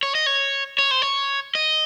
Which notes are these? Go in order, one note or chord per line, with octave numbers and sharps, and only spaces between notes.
C#5
D#5
C#5
C#5
C5
C#5
D#5